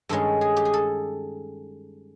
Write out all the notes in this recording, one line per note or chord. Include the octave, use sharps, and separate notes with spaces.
G2 D#3 G#3 C#4 A4
G#4
G4
G#4
A4